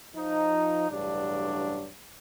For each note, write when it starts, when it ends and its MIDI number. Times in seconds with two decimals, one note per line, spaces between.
0.16 0.87 53
0.16 0.87 63
0.90 1.89 33
0.90 1.89 43
0.90 1.89 49
0.90 1.89 54
0.90 1.89 62